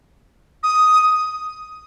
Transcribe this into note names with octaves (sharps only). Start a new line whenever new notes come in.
D#6